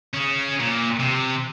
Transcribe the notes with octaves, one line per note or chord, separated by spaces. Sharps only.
C#4 G#4
A#2
C3